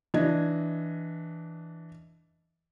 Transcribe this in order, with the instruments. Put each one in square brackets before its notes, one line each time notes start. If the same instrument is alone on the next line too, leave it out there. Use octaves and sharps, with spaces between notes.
[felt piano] E3 D4 D#5 G#6